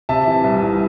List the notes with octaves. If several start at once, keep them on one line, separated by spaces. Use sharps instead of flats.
C3 E5 A5
E3
C2
C2